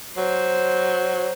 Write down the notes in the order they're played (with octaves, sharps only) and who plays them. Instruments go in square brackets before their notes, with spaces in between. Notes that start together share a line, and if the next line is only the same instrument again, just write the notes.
[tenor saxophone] F#3 [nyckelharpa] C5